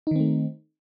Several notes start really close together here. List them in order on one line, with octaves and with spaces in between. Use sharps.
D#4 D#3 C4 A3